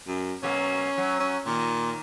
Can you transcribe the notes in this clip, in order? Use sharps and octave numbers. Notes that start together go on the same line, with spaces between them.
F#2
B2 F#3 A#3 C#4
F#3
C#4
A#2 D#3 A#4